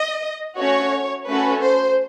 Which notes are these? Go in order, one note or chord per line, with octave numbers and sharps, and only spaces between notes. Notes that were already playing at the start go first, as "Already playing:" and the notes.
Already playing: D#5
A3 C#4 F#4 C#5
A3 C#4 F#4 A4 B4
C5